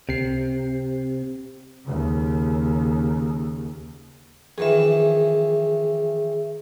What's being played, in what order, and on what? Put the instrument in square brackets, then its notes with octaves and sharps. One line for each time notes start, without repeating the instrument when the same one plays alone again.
[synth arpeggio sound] C#2 C7 [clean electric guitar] C3
[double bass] D#2 C#3
[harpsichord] F2 D#3 E3 [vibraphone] G#4 E5